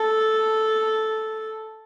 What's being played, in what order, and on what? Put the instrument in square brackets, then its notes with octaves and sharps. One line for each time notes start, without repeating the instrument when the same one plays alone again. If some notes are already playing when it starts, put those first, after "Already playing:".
Already playing: [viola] A4